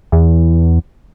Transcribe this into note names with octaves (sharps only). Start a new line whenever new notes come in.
E2